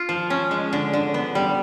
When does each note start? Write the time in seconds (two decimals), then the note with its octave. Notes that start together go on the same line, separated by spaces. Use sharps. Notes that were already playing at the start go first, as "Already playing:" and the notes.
Already playing: F4
0.09 F3
0.30 C#4
0.51 G#3
0.73 D3
0.93 D3
1.14 B3
1.35 G3